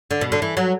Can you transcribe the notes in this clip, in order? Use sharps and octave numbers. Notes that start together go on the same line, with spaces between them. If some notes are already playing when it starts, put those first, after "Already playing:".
D3
B2
D3
E3
F#3